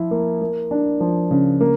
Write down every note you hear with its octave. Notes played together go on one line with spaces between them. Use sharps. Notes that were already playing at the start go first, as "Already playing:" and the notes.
Already playing: F3 E4
A#3
A#3
D4
F3
C#3
A#3